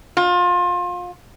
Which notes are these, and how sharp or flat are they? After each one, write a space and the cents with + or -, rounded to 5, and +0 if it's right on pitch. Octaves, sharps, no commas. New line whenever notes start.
F4 +30